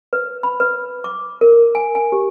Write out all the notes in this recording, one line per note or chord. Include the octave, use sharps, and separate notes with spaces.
B4
B5
B4
D6
A#4
G#5
G#5
G4